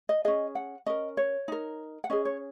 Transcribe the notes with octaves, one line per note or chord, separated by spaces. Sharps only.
D#5
C#4 G#4 D#5
F#5
C#4 A#4 D#5
C#5
D#4 A#4
F#5
C#4 G#4 D#5
C#5